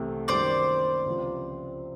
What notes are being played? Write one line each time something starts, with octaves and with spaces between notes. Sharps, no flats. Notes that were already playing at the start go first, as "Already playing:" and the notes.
Already playing: C2 C3 E3 A3
F#2 D#3 G3 A#3 C5 D5
C#2 C3 F3